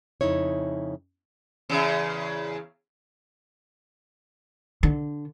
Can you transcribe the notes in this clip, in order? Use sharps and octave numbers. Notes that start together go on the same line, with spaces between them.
F2 C#3 D#4 E4 C#5
E2 C#3
D3